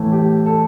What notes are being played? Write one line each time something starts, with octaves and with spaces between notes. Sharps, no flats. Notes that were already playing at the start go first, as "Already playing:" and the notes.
Already playing: A2 E3 A3
G4
A4